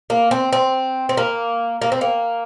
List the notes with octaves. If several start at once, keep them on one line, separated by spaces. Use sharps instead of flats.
A#3
C4
C4
C4
A#3
A#3
C4
A#3